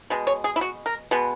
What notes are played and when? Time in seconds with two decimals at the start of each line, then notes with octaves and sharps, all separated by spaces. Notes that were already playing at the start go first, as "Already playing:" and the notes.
0.10 B2 G#3
0.27 C#5
0.44 G#4
0.56 E4
0.61 F#4
0.86 A#4
1.11 B2 G#3 B3